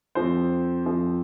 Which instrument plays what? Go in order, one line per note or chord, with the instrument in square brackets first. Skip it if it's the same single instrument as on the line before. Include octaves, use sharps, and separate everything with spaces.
[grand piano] F2 F3 C4 C5
F2 F3 C4